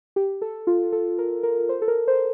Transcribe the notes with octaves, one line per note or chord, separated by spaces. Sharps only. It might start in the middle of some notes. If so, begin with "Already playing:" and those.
G4
A4
F4
A4
A#4
A#4
C5
A4
A#4
C5